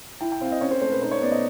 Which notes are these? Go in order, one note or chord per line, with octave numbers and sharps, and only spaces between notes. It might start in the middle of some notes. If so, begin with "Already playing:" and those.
E4 G5
G5
C4 F5
D#5
C#4 C#5
C5
A3 C5
B4
D#4 C5
C#5
B3 D5
D#5